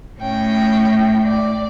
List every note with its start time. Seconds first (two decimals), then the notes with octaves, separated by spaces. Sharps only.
0.20 A2 C#4 G5
1.23 D5